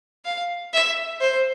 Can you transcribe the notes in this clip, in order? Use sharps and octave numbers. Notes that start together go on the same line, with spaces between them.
F5
E5
C5